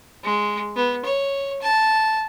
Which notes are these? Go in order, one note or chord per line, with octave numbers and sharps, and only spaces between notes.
G#3
B3
C#5
A5